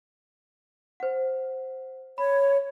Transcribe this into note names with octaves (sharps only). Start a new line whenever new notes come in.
C5 F#5
C#5 B5